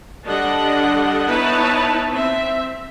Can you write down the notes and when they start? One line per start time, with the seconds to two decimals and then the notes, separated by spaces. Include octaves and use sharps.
0.25 D3 G3 D4 D#5 F#5
1.27 B3 D#4 E4 B4 C#5 A5
2.10 C4 E5